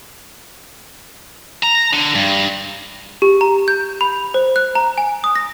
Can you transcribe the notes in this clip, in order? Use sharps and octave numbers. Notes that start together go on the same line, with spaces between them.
A#5
D3
G2
G4
A#5
G6
B5
C5
F#6
A#5
G#5
D#6
A#6